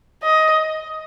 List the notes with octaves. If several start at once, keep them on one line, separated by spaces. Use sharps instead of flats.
D#5